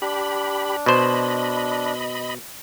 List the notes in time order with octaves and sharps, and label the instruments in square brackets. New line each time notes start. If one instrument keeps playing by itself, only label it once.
[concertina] D4 [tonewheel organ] G4 B5
[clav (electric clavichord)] B2 C5 [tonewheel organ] D#5 B5